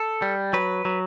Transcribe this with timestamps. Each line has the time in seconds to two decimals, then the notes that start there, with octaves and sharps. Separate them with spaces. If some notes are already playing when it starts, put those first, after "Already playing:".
Already playing: A4
0.22 G3
0.53 F#3 B4
0.85 F#3